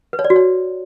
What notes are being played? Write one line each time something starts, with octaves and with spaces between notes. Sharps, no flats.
B4
C#5
D5
F#4
C#5